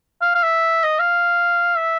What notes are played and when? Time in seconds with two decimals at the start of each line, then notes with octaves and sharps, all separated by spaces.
0.22 F5
0.35 F5
0.43 E5
0.84 D#5
0.99 F5
1.76 E5